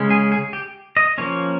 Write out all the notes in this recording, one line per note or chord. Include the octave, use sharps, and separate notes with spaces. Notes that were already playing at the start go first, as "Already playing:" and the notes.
Already playing: C#3 G#3 C#4
G#4
G#4
G4
D#5
F3 A#3 C#4 C#5